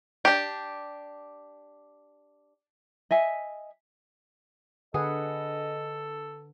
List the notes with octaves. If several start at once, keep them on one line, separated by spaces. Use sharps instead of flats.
D4 G4
D#5 E5 G#5
D3 G#4 A4 B4 D#5 F#5